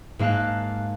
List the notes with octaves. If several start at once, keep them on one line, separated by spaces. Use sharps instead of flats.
G#2 A#3 F5 A5 F#6